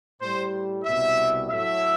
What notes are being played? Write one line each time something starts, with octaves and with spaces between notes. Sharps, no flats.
A2 G3 C5
C2 B2 G3 E5
A2 F#3 A3 E5